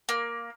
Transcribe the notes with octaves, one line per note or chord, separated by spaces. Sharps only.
A#3